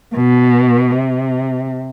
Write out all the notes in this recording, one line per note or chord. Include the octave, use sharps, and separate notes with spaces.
B2
C3